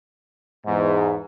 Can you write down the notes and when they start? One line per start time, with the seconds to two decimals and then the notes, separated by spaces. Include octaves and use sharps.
0.66 E2 G#2